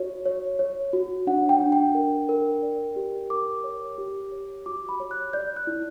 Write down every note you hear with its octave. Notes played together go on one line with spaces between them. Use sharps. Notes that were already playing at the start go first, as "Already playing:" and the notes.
Already playing: F#4 C#5
C#5
C#5
F#4
D4 F#5
G5
D4
G5
A#4
A#4
D5
G4
A#4 D6
C#5
G4
C#5
F#4 D6
B5
C#5
F#6
D5 G6
F#6
E4